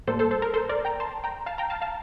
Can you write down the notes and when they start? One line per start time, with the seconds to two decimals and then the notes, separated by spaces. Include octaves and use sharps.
0.07 A2 G3 A#3 A4 C5
0.19 A4 C5
0.31 A4 C5
0.42 A#4
0.54 A4 C5
0.69 A#4 D5
0.85 G5 A#5
1.00 A5 C6
1.24 G5 A#5
1.46 F5 A5
1.58 G5 A#5
1.70 F5 A5
1.82 F5 A5